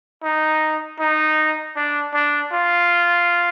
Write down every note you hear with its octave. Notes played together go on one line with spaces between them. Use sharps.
D#4
D#4
D4
D4
F4